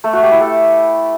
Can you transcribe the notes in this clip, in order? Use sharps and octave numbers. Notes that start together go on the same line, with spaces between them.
A3
F#4
G4
E4
A4